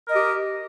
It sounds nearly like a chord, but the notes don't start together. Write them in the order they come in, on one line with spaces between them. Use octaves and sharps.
A#4 D#5 G4